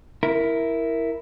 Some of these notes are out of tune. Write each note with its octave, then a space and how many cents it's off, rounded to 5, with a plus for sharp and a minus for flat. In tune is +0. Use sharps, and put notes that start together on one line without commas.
E4 +0 A#4 +0